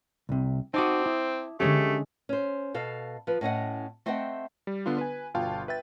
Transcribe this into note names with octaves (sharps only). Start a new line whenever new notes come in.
C2 C3
C4 D#4 F#4 A5 D6 D#6
E4
D3 G#3 A3 C#4 G4 C#5
C#4 C5
B2 A4 F5
F3 B4
A2 C#4 D#5 F#5
A3 C4 D#5 E5 F#5 G5
G3
D3 B3 D4 F4
B4 G#5
G1 B2 F4 F5 G5 A5
B4 E5 G5 A6